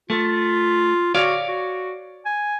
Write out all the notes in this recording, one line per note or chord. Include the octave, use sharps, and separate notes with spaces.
A3 F4
F#4 C#5 D5 F5
F#4
G#5